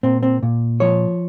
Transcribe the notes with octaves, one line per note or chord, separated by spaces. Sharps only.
A#2 C4
C4
A#2
F3 C#5